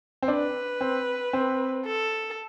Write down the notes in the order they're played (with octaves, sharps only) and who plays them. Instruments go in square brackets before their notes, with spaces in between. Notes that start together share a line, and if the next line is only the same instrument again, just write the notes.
[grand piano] C4
[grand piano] D4 [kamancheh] B4
[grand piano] C4
C4
[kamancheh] A4